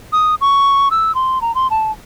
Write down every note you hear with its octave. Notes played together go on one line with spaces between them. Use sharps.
D#6
C#6
E6
C6
A#5
C6
A5